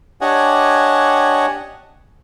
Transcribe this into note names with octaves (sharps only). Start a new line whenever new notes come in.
D4 G4 C#5 D#5 F#5 G#5